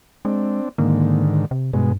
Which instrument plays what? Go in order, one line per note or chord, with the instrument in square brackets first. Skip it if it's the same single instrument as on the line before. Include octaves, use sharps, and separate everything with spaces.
[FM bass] G#3 [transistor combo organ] C4 D4
[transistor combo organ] G#2 D3 D#3 [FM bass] A#3
[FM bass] C3
[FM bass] G2 [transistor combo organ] B2 G#3